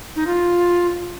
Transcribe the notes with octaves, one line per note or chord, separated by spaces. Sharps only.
D#4
F4